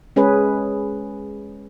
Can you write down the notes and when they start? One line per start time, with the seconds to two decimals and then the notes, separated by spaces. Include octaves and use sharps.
0.16 G#3 C#4 G#4 B4